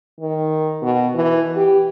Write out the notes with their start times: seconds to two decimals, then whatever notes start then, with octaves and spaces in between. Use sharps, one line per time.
0.20 D#3
0.82 B2
1.15 E3
1.56 G4